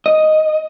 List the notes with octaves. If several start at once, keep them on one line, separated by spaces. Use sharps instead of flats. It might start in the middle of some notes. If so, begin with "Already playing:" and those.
D#5